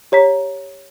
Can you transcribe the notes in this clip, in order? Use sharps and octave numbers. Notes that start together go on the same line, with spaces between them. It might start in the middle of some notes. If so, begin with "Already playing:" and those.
G4 C#5 A#5 B6